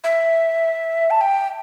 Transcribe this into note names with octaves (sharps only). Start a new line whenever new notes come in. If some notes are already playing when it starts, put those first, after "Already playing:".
E5
A5
G5